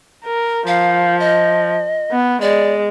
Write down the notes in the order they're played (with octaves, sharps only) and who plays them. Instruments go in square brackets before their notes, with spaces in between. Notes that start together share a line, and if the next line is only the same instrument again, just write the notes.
[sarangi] A#4
[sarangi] F3 [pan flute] F5
[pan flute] D#5
[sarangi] B3
[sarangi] G#3 [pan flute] D5